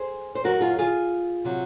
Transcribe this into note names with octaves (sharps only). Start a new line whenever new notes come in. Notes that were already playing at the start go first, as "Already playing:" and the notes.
Already playing: G#4 C5
C5
F#2 D#3 F#3 F#4 A#4
F4 G#4
F4 G#4
C3 F#3